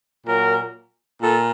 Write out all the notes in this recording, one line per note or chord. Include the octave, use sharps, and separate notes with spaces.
A#2 F#3 A#4
A#2 A4